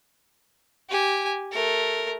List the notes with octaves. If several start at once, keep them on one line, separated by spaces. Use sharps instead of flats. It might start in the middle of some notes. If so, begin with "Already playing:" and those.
G4 G#5
A3 A#4